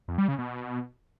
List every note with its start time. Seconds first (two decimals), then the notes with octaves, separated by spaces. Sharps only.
0.08 F2
0.18 G3
0.28 C#3
0.38 B2